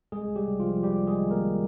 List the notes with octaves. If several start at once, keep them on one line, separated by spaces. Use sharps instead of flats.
C2 G#3 G#4
G3 G4
C3
F3 F4
C2 G3 G4
G#3 G#4
D#3
A#3 A#4